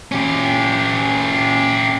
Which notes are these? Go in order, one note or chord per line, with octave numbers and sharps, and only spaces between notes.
C#4 G4